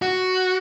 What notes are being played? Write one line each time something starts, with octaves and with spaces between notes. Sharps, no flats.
F#4